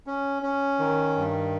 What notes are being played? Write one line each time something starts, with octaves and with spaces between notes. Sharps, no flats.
C#4
C#4
D#3
G2